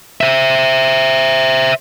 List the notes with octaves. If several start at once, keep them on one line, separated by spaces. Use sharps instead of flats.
C5 E5